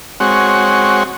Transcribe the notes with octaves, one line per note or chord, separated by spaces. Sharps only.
G#3 C4 F#4 C#5